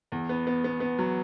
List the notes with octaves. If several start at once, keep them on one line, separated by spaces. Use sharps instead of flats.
E2
B3
B3
B3
B3
F#3